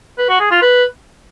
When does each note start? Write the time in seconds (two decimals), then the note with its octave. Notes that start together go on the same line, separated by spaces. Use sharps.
0.18 B4
0.29 F#4
0.40 G#4
0.51 F4
0.62 B4